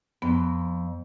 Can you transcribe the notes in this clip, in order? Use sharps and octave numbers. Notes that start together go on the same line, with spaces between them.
F2 B3